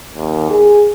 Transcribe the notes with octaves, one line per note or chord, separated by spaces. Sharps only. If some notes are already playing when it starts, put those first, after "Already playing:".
D#2
G#4